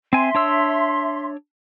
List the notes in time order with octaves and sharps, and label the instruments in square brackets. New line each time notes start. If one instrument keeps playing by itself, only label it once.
[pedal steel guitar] C4 G#5 [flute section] E5 C6
[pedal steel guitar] D4 C#5 E6